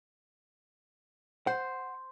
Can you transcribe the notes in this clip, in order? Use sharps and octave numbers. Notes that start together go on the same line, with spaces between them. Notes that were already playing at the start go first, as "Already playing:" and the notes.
C5 F#5